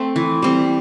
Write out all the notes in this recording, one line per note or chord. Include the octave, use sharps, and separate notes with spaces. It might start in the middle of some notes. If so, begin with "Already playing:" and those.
Already playing: A3 C4
E3
G3 C4